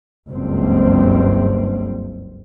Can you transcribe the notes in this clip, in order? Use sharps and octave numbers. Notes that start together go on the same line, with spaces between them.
F#1 C#2 G2 C4